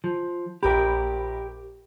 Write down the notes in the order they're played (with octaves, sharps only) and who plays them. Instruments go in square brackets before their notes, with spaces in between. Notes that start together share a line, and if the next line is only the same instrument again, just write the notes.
[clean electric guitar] F3
[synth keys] A#1 B5 [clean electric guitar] G4 A#4